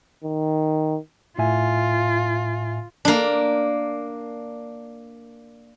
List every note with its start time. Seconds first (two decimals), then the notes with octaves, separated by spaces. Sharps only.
0.24 D#3
1.39 A2 F4 E5 G#5
3.05 A#3 D4